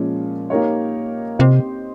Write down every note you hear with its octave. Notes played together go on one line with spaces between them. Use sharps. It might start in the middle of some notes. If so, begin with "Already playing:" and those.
Already playing: A#2 F3 G#3 C#4
A#3 D#4 G4 A#4 C#5
C3 C4 G4 C5 D#5